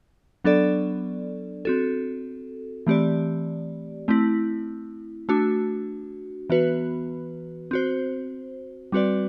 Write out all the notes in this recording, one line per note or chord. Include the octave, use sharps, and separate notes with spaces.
F#3 B3 D4 A4 D5
C4 F#4 A4
E3 A3 C4 G4 D5
A3 C4 E4
A3 D4 F#4
E3 B3 F#4 B4
C4 F#4 C5
G3 C4 F#4 B4 D5